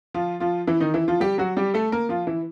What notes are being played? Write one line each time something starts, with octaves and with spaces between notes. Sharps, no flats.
F3 F4
F3 F4
E3 E4
D#3 D#4
E3 E4
F3 F4
G3 G4
F#3 F#4
G3 G4
A3 A4
A#3 A#4
F3 F4
E3 E4